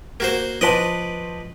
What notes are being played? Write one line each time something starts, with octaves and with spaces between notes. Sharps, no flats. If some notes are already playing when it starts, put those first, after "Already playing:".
A#3 F#4 C5
F3 B4 C5 D5 D#5 A5